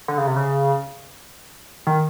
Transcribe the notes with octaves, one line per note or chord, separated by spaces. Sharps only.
D3
C#3
C3
C#3
D#3